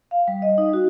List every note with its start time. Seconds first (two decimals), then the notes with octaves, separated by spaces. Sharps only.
0.11 F5
0.28 G3
0.42 D#5
0.58 D#4
0.73 F#4